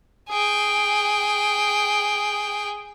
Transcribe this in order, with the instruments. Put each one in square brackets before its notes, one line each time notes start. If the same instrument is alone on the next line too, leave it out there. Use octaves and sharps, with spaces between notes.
[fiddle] G#4 G5